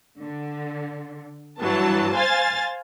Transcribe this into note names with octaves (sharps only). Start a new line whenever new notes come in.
D3
G2 E3 F#3 A5
C5 F5 G#5 A6